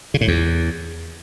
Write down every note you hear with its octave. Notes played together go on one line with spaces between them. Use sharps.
C#3
A2
E2